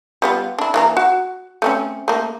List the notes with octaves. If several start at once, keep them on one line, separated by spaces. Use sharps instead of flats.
G3 B3 F4
D4 E4
E3 A#3 A#5
F#4
A3 C4 C#4
A3 A#3